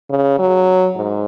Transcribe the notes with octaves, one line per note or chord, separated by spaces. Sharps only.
C#3
F#3
G#2